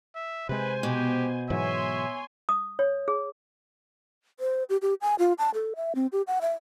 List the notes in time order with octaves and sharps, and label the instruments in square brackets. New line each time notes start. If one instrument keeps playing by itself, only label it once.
[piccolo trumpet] E5
[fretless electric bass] C3 G#3 [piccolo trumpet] B4 [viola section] C5 G#5
[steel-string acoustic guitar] B2 [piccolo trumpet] G4
[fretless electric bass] G#2 E3 F#3 [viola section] C#5 G#5 C6 [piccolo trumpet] E5
[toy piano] D#6
C#5
G#4
[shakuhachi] C5
G4
G4
G#5
F4
A5
A4
E5
C4
G4
F#5
E5